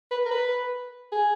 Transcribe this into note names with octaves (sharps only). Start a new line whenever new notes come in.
B4
A#4
B4
G#4